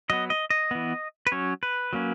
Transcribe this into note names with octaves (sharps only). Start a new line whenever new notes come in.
F#3 B3 D#5
D#5
D#5
E3 B3
B4
F#3 C#4 C#5
B4
F#3 A#3 C#4